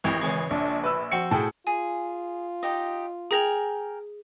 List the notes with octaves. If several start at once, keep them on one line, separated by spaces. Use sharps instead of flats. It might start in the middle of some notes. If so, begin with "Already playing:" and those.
G#1 E3 E4 G4 A#6
C#3 E3 G#3
A#1 D4
B4 E6
F3 C4 F#4 C#7
A2 G#4 G5 A5
F4 G#4 G#5
D#4 G4 D#5
G#4 A#4 G5 G#5 A#6 F7